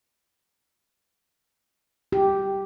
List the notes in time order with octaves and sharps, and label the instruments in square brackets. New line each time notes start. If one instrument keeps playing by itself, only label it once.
[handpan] G4